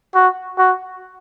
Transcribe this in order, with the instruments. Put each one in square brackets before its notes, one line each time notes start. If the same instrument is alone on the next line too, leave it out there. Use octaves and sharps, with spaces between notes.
[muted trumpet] F#4
F#4